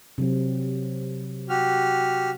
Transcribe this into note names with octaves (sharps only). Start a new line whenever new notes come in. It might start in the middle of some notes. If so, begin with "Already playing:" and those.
C3 F#3 C4
F#4 G4 F6